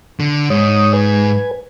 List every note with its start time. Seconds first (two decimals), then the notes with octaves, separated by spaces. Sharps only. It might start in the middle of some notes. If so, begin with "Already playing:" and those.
0.20 D3
0.50 G#2 C#5 D#6
0.93 B4 G#5